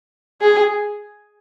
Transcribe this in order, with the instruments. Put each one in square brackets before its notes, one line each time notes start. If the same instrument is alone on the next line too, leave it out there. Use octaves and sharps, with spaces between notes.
[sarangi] G#4